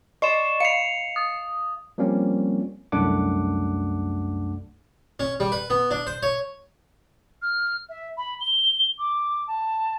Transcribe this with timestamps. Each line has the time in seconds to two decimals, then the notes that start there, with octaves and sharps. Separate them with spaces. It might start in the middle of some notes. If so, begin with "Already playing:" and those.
0.22 D5 D#5 C6 C#6 E7
0.60 F5 C7 C#7 F7
1.16 D#6
1.98 F3 G3 A#3 C4 C#4
2.92 C2 F#2 A3 D4 F#5 D6
5.20 C#4
5.40 G3
5.52 B4
5.70 B3
5.91 D4
6.07 C5
6.23 C#5
7.42 F6
7.89 E5
8.17 B5
8.41 G7
8.98 D6
9.47 A5